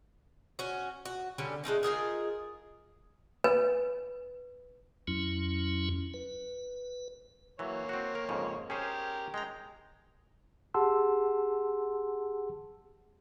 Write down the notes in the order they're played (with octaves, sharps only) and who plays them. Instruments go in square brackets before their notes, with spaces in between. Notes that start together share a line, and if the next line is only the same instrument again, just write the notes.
[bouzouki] C#4 F#4
F#4
D3 G3 C#4
G#3 A3 C#4 D#4
D#4 F4 G#4 A#4
[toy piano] B4
[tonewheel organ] F2 F#3 C#4 E4
B4
[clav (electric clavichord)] E3 F#3 [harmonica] A#3 C#5
[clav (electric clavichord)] C4 F#4
A#4
F2 G#2 C#3
[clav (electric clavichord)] C#4 G#4 C5 [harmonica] G4 A#4
[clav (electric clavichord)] G#3 A#5 [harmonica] G5
[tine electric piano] G4 G#4 F#5 A5 C6 E6